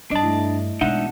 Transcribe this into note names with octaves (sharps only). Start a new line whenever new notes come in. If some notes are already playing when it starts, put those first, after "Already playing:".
G2 D4 D#5 A5
A3 E4
B2 E3 G#3 D4 D#4 E5 F#5